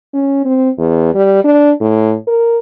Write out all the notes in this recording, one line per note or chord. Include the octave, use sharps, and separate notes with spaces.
C#4
C4
E2
G3
D4
A2
A#4